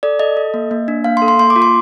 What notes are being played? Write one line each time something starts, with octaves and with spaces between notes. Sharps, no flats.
A4 D5
A4 D#5
A4
A#3
A#3
D4
A#3 F5
C6
A4
C6
A#3 C6
D6
F4
C6